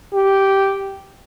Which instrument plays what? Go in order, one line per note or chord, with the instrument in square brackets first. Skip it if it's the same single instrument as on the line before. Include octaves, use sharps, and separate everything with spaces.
[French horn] G4